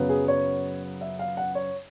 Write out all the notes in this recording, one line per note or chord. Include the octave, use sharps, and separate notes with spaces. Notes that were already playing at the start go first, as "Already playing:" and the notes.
Already playing: F#2 C#3 F#3 B3
G#4
C#5
E5
F5
F#5
C#5